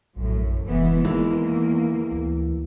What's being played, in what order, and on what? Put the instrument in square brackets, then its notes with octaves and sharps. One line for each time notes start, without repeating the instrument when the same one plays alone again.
[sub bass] A#1 [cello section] F#2 A2
[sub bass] F1 [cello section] E3 G#3 B3
[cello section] E2 A#3 [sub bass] D#3 [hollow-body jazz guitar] E3 G#3
[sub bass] D2